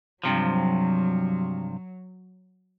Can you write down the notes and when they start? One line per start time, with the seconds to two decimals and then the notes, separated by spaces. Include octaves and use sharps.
0.24 G2 C3 F3 F#3